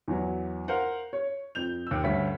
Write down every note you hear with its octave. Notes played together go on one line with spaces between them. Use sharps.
E2 E3 F#3
A#4 C5 F5 F#5
C#5
F2 G6 F7
D#2 E6
D2 G2 C#4 B6